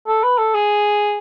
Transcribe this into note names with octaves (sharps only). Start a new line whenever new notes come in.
A4
B4
A4
G#4